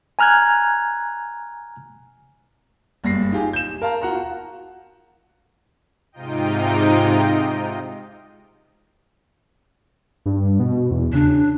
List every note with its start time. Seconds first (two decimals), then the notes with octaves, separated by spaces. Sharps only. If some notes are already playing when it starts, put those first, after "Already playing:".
0.19 G#5 A#5 F6 F#6 G#6
3.04 F#1 G2 A#6 C7
3.32 D#4 F4 G4 G#4
3.53 G6 E7
3.81 A#4 F5 A5 A#5
4.02 F4 F#4 F#5 A#5
6.12 G#2 C3 D#4 F4 D#5 G5
10.26 G2
10.59 B2
10.91 E2
11.13 C#3 D4